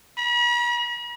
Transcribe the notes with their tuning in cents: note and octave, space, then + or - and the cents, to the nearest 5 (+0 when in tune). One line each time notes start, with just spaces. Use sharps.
B5 -45